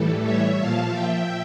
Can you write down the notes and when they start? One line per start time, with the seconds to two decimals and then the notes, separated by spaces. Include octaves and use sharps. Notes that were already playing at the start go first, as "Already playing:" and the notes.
Already playing: A2 E3 G3 A4
0.24 C#5 E5
0.59 A#2 F3 F5 A5
0.93 E5 G5